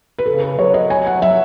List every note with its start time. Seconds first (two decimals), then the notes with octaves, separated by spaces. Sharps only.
0.18 B4
0.26 C#3 A4
0.43 B4
0.58 F#3 C#5
0.74 D#5
0.90 G#5
1.07 F#5
1.22 F#3 E5